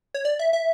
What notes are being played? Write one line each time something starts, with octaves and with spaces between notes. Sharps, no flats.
C#5
D5
E5
E5